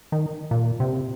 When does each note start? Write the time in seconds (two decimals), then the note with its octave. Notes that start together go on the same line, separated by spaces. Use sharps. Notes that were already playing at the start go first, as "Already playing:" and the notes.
0.12 D#3
0.51 A#2
0.80 C3